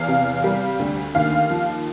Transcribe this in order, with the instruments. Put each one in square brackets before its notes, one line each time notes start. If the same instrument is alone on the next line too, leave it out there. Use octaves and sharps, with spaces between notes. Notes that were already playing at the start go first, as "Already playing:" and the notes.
Already playing: [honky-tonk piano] E2 F5
C3
G3
D2
D#2 F5
F3